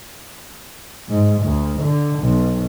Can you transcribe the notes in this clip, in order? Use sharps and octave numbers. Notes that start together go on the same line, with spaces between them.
G#2
D2
D3
B1